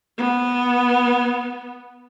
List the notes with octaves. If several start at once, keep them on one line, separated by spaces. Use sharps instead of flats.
B3